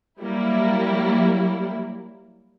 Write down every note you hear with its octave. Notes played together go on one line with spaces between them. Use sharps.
F#3 G3 A#3 E4